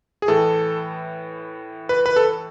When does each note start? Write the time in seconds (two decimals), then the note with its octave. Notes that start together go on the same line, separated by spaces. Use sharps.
0.22 G#4
0.28 A2 E3 A4
1.89 B4
2.06 B4
2.16 A4